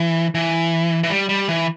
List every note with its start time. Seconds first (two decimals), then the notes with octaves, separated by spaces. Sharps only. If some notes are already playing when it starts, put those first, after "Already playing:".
Already playing: E3
0.35 E3
1.03 E3
1.10 G3
1.29 G3
1.49 E3